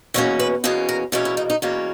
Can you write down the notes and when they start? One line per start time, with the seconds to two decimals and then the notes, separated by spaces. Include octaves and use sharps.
0.14 E2 B2 A#3 C#4 C#5
0.39 B4
0.64 E2 B2 A#3 C#4 G#4
0.89 A#4
1.12 E2 B2 A#3 C#4 E4
1.25 E4
1.37 D#4
1.50 D#4
1.62 E2 B2 A#3 C#4